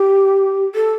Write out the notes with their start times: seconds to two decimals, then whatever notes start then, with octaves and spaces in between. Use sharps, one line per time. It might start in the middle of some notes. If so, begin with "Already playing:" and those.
Already playing: G4
0.75 A4